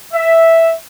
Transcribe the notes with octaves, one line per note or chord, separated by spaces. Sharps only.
E5